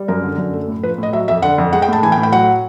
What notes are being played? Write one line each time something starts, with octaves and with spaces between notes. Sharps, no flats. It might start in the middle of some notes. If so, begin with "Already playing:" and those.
Already playing: G3
F#2 A#4
D3
F#2
A3
A2
F3 B4
A2 D#5
F#3 E5
F2 E5
D3 F#5
F2
G#3 F#5
G5
A2 A5
E3 G#5
G5
A2
G5
F#3 F#5